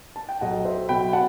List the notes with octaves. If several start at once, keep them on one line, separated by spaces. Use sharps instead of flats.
A5
G5
B1 D#5 F#5
C5 E5
B2 F#3 G5 B5
F#5 A5